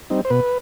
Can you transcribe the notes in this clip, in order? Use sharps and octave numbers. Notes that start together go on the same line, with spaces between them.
G3 C4 D#4
C5
B2 B4